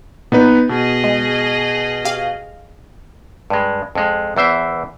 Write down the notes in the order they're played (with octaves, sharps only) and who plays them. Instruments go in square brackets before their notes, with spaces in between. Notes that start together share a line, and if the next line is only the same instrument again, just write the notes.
[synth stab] A#2 [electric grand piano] B3 D#4 B4
[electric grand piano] B2 [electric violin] G#4 D#5
[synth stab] G#3
G4 F5
[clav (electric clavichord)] G2 G#3
F2 G#3
E2 E3 C5 E5